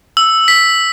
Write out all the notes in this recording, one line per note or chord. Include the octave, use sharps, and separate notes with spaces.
E6
B6